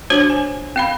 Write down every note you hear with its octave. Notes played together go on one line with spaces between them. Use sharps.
D4 F#4 C5 C#5
G#5
C4 F5 B5